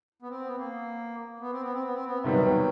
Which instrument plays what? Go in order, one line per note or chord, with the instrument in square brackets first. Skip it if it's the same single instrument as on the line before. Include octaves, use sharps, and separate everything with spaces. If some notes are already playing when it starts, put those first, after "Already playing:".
[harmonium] B3
C4
B3
A#3
B3
C4
B3
C4
B3
C4
B3
[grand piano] C3 D#3 G3 B3 [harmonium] F#3